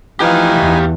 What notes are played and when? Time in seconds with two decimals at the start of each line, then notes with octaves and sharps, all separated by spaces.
0.20 E3 F3 D#4 G4 B4 F5 G#5
0.59 E2